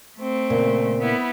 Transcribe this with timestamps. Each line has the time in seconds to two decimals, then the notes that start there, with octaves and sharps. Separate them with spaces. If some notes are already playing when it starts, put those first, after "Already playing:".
0.17 A3 C4
0.50 A#2 C#3
0.98 B3 E4